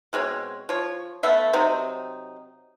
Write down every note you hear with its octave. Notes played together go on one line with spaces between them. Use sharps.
B2 G#3 C4 C#5
F3 C#5
A3 B3 E5 F5
C3 F#3 C4 D#4